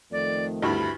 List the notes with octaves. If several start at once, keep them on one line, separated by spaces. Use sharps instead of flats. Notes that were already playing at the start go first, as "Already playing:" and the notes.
F2 D#3 A3 D5
D2 G2 E4 B5